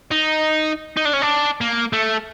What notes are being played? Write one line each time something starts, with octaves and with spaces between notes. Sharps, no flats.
D#4
D#4
D4
C#4
D4
A#3
A3